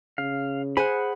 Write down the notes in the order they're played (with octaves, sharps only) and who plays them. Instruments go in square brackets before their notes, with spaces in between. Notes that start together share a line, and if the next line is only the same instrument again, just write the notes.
[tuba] C#3 [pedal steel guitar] F5
[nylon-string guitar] G#4 C5 G#5 [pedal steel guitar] F#5 B5